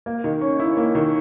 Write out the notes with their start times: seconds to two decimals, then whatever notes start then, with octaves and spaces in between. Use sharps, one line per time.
0.06 A#3
0.24 D#3
0.41 C#4
0.60 E4
0.77 A#3
0.95 D#3